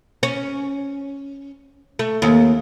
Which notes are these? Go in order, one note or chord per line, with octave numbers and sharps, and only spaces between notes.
C#4
A3
D#2